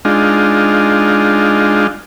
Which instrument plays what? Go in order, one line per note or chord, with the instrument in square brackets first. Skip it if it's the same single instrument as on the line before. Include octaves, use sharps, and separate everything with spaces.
[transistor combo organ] G#3 D4 D#4 F4